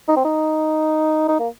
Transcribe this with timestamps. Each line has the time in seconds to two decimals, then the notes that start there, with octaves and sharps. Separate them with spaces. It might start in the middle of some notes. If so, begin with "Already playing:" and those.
0.08 D#4
0.16 C4
0.25 D#4
1.28 D#4
1.39 A#3